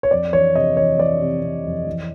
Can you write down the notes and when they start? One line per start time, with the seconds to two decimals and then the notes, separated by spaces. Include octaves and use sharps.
0.03 C#5
0.11 F2 D5
0.33 E3 C#5
0.55 C3 D#5
0.77 E3 C#5
0.98 E3 D5
1.21 C3
1.43 C3
1.64 F2
1.87 E3